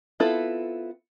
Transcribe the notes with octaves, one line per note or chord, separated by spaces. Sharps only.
B3 C4 E4 F4 A4